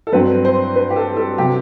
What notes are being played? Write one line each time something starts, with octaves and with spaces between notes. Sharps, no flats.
A4
G2 F#3 C4 B4
C5
B4
G4
A4
A4
C3 F#3 G4